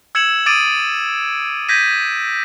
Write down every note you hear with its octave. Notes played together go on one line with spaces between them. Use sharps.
E6 G#6 C#7 E7 F#7
D6 D#6 A6 D7 D#7
G6 G#6 A#6 B6 D#7